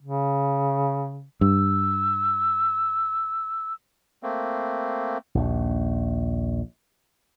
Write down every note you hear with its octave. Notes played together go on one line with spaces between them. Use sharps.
C#3
G2 E6
A3 A#3 C4
A#1 D#2